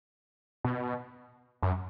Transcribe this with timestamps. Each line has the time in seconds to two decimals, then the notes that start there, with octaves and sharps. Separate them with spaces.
0.64 B2
1.62 F#2